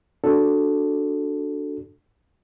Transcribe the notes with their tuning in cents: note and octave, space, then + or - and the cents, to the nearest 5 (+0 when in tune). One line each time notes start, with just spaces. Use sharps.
D4 +0 F#4 +0 A4 +0